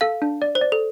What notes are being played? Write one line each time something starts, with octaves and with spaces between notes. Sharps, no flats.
A4 F5
D4
D5
C5
D5
A4